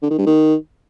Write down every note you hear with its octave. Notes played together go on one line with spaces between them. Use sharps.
D3
D#3
G2
D#3